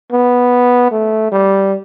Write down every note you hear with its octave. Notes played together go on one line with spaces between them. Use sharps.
B3
A3
G3